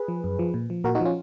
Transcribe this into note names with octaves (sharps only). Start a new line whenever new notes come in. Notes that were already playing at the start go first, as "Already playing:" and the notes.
Already playing: G#4 B4
F3
F#2
F3
A#2
F3
A#2 F#4 A#4
D#4 F#4
F3
C#4 F4